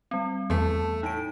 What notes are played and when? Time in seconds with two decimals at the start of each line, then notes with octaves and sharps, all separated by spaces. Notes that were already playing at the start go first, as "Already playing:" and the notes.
0.11 G3 C4
0.50 E2 E3 A3 A5
1.03 A2 D#4 D7